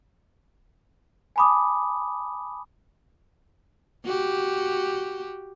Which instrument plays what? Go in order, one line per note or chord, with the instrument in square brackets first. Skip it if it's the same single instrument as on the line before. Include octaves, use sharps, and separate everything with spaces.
[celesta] G#5 A5 B5 D6 D#6
[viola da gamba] F#4 G4